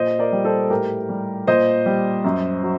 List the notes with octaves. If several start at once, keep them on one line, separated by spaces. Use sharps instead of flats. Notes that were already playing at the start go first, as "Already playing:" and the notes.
Already playing: A#2 C5 D#5
A#4 D5
G3
A4 C5
A2 G4 A#4
G3
A#2 C5 D#5
G3
F#2
F#3